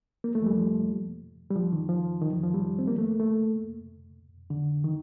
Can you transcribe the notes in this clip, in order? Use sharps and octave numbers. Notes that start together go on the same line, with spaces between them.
A#3
A3
F3
G3
F3
G3
F3
D#3
F3
D#3
F3
F3
G3
C4
A#3
A3
A3
D3
D#3